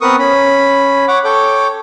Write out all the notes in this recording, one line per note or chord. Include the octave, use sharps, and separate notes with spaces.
B3 C4 A#4 B4 C#6 D#6
C#4 B5
C#5 F#5 D6
A4 C#5 G5 D6